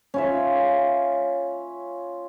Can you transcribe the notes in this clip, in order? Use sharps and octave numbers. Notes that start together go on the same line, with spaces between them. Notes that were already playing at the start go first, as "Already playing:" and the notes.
C#4 F4 E5